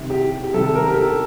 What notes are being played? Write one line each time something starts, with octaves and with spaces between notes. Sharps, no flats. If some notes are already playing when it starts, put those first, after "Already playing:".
Already playing: C3 D#3 G3
G4
G4
C3 D#3 G3 A4
A#4
G4
A4